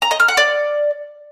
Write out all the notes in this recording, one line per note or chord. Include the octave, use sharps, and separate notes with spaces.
A#5
D#5
F6
F#5
D5